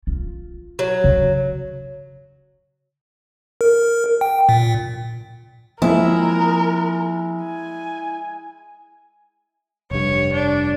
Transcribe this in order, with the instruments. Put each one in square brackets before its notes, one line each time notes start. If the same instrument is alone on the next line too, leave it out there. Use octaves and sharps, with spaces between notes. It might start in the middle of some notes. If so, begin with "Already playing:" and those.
[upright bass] F4
[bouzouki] F#3
[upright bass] C#3
[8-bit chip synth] A#4
G5
A#2
[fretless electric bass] F3 A#3 C4 [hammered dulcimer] G#3 E5 [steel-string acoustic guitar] E4 [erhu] A#4
[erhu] G#5
[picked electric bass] F1 G2 [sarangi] C#5
[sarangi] D4